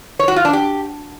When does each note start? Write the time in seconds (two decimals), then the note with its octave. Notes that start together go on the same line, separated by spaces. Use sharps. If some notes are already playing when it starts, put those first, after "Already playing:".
0.19 C#5
0.28 F#4
0.36 F4
0.45 D4
0.53 G4